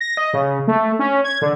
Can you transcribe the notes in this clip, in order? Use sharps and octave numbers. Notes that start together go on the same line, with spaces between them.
A#6
D#5
C#3
A3
C#4
G#6
D3